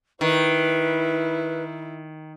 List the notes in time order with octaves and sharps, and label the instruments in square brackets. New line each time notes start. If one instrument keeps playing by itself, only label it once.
[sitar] D#3 [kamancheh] E4 [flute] B4